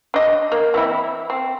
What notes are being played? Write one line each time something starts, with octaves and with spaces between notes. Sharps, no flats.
D4 D#5
A#3
E3 C4 E4
C4